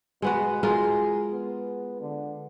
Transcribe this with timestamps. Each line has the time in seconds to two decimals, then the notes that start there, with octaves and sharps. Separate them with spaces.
0.22 B2 G#3 B3 F#4
0.63 G#3 F4 G#4 A#4
1.32 B3
2.01 D3